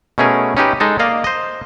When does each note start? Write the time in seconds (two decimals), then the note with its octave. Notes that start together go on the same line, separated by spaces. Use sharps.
0.18 B2 A3 C#4 G#4 A#4
0.57 C#4 D#4 G4 B4
0.80 G#3 D#4 A4
0.99 A#3 D5 D#5 F5
1.24 C5 D#5